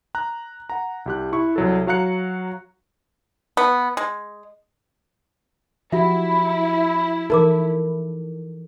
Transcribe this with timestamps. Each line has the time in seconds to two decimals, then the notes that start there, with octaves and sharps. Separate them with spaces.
0.15 A#5 F#6
0.70 F#5 A#5
1.06 C2 G4 F#6
1.32 E4 C#6
1.56 C2 F#3 A4
1.87 F#3 F#4 F5 A#5 F#6 C#7
3.57 B3
3.97 G#3
5.92 F3 E4 F#4 G4 E5
7.30 E3 D#4 A4 A#4 D6